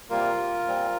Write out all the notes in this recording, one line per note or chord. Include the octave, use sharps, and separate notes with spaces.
C3 G3 A#3 F4 A#4
A#2 G3 C4